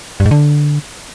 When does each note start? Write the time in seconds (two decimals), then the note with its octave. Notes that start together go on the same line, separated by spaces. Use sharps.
0.20 G2
0.26 G#2
0.31 D3